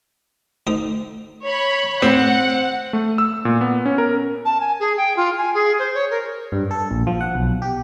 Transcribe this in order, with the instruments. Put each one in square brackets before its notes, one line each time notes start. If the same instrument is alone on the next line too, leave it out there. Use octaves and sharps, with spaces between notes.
[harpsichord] D2 D#4 D#6
[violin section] C#5 B5
[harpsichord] A2 [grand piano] C4 [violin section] F#5
[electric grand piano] A3
E6
A#2
B3
C#4
A#4
[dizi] A5
G#5
G#4
G5
F4
G#5
G#4
C5
C#5
A#4
[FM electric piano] G2
A4
A#1
F3
F#5
B1
G4